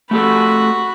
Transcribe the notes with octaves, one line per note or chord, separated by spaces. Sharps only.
A3 F#4 G4 A4 B5